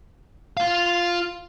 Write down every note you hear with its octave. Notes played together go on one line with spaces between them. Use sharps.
F4 F5